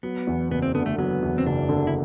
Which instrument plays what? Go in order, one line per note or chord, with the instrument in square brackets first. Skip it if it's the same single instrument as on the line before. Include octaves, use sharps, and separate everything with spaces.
[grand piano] F#3 [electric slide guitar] B3
[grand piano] E2
[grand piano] F#1 [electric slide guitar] B3
[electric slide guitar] C4
[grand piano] D3 [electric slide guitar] B3
[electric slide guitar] A3
[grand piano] F#3 [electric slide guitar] B3
[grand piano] E2
[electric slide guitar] C4
[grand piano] F#1 [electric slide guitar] D4
[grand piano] D3
[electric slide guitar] E4